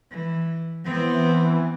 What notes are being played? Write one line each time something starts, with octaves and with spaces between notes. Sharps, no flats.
E3
E3 B3 C4